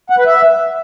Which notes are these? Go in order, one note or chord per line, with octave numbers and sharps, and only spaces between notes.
F#5
B4
E5